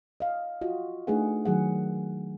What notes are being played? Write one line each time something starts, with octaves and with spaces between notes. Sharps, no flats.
D#5 F5
F4 F#4 D#5
A3 D4 D#4 G#4 B4 F#5
D#3 F#3 G#4 F#5